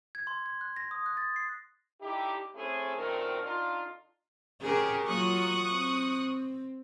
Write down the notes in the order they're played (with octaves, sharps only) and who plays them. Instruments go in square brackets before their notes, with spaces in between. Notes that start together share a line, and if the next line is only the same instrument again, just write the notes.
[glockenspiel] G#6
C6
G#6
F#6
A#6
D#6
F#6
A6
C7
[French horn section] D3 D#4 E4 G4
A3 C4 C#4 E4 G#4 A4
F#2 A#2 D#3 A3 C4 A#4
D3 D4 D#4 F4
[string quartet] C#3 G4 [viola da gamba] G#4 A#4
[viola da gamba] F#3 A#3 F4 [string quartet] C#6 D#6 F#6
[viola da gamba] C4